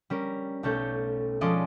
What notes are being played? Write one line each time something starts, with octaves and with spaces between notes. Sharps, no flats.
G3 C#4 A#4
B1 A3 C#4 A4 G6
F3 G#3 C#4 A4 D5 D#5